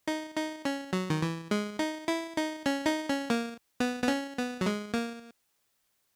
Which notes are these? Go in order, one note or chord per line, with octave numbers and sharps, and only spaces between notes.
D#4
D#4
C#4
F#3
D#3
E3
G#3
D#4
E4
D#4
C#4
D#4
C#4
A#3
B3
B3
C#4
B3
F#3
G#3
A#3